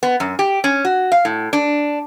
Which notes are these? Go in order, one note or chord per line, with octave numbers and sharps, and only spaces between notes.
B3
F#2
G4
C#4
F#4
F5
A2
D4